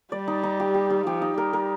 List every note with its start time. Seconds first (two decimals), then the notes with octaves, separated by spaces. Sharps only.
0.12 G3 D5
0.28 D#4
0.43 D#4
0.60 G4
0.74 G4
0.90 D#4
1.07 F3 G4
1.22 D#4
1.38 G3 A#4
1.53 A#4